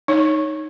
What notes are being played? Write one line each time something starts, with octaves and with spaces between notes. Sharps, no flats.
D#4 C#5